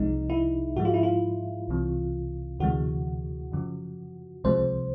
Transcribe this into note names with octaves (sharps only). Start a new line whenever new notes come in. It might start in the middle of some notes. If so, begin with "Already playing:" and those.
Already playing: C2 C3 F3 G#3 D#4
E4
G#2 F3 G#3 F#4
F4
E4
F4
C2 C3 E3
D2 C3 E3 G#3 F#4
F#2 C#3 F3
C#2 C3 F3 G#3 C5